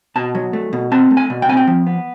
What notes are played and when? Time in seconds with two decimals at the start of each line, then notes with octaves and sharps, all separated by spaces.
0.16 B2 A5
0.35 F#3
0.53 A3
0.73 B2
0.92 C4 A5
1.11 A3
1.17 G#5
1.30 B2
1.42 G5
1.49 C4 G#5
1.57 G5
1.67 F3
1.87 B3